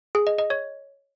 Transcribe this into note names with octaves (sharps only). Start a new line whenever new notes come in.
G#4
D#5
D#5
C#5